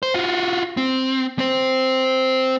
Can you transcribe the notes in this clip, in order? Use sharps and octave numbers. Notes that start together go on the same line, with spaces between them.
C5
F4 F#4
C4
C4 C5